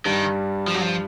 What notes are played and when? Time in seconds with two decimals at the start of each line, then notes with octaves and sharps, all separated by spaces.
0.05 G2 D#3 G3
0.67 F3
0.74 F#3
0.81 F3